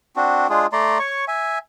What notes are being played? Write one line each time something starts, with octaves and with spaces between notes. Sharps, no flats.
C4 D4 F#4
G#3 D4 F4 G#4
A3 D5 A#5 C6
C#5 C#6
E5 G#5